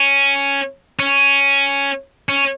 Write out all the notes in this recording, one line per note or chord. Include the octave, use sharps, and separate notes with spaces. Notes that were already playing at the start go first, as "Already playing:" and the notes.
Already playing: C#4
C#4
C#4